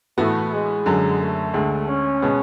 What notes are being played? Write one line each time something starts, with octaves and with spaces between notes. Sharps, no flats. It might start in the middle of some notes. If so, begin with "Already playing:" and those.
A2 E3 A3 B3 F#4
G#3
F#2 D3 F#3
A3
D2 D3 G#3
C#4
B2 G#3 B3